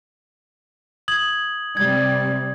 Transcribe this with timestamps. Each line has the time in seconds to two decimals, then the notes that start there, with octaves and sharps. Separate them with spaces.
1.08 D#6 G#6 F#7
1.77 C3 G3 G#6